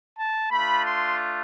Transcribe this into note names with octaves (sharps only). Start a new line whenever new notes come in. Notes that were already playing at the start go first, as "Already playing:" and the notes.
A5
A3 D4 F4 B5
C6